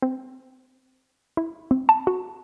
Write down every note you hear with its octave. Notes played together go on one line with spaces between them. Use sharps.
C4
E4
C4
A5
F#4